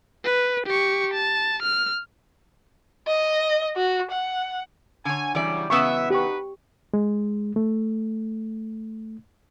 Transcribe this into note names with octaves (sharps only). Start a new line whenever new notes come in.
B4
G4 C#6
A5
F6
D#5
F#4
F#5
D3 C#5 G#5
C#3 E3 F#3 G3 D5
C#3 E3 F#3 G#3 B3 E5 C#6 E6
D#4 F#4 G4 B4 C#6
G#3
A3